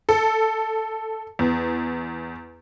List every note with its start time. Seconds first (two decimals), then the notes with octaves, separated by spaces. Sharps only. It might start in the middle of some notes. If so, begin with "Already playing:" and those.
0.09 A4
1.39 E2